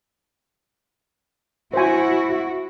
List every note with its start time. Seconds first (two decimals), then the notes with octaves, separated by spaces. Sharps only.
1.74 E4 F#4 C5 G#5